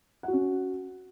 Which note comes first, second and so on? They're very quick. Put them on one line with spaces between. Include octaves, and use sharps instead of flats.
F#5 F#4 C#4